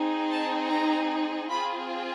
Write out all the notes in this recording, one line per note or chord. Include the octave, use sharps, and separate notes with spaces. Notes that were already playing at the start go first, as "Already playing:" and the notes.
Already playing: C4 D#4 G#4
A5
A#5
C4 F4 G#4 B5